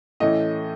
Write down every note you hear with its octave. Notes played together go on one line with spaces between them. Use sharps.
A2 E3 A3 C#4 D#5